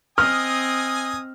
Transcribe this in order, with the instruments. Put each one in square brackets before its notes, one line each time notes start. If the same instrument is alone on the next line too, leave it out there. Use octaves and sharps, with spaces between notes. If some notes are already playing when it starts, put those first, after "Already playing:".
[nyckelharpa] C4 D#5 [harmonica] G#5 D#6 [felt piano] F6